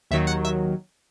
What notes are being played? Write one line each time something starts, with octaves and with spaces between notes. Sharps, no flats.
D#2 D#3 F#3 E5
F#5
E5